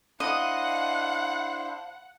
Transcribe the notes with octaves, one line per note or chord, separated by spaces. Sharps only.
D4 E4 C5 D#5 F5 F#5